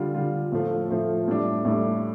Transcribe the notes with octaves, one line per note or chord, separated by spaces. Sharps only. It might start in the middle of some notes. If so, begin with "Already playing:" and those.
Already playing: D3 G3 F4
D3 G3 F4
A2 F3 A3 F4
A2 F3 A3 F4
A2 G3 D4
A2 G3 D4